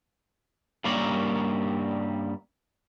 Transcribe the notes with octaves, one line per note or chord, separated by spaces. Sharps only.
G2 G3 A#3 C#4 A#4 D5